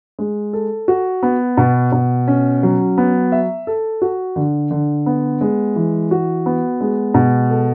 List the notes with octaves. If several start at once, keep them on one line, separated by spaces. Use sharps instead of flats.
G#3
A4
F#4
B3
B2
B2
C#4
F#3
B3
E5
A4
F#4
D3
D3
B3
G#3
E3
F#4
B3
G#3
B2
A4